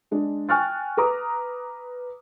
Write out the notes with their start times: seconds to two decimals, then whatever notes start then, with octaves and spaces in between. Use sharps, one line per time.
0.11 G#3 D4 G#4
0.49 G5 G#5 C#6 F6 F#6 A6
0.97 B4 A#5 D6 D#6